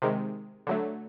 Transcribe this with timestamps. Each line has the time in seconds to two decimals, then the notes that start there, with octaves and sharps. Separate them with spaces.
0.02 C3 D#3 G#3
0.67 D3 F#3 A3